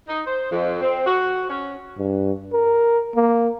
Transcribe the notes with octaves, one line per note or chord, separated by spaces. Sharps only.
D#4
C5
F2
C4
F#4
C#4
G2
A#4
A#3